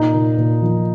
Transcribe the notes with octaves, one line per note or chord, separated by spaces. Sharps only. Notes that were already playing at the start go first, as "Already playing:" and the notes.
Already playing: A#2 D#4
A#2
A#2
F3